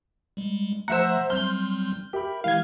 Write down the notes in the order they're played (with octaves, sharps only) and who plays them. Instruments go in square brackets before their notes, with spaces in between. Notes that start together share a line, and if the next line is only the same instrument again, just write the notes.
[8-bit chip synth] G3 G#3
[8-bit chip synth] F3 A3 [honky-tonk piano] C5 E5 A#5 [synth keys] F#5 E6
[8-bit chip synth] F#3 G3 C4 [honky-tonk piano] C6 F6 [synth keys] G6
[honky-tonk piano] G4 [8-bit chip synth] A#4 E5 B5
[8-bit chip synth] E3 G#3 E4 [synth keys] F5 G#6